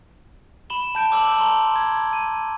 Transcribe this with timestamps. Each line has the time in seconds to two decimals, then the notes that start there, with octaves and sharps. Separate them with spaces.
0.70 B5 E7 G7
0.95 A5 G6 D7
1.11 A5 D6 E6 G6 F#7
1.37 A5 A#5 C6 G7
1.76 G#6
2.13 D#7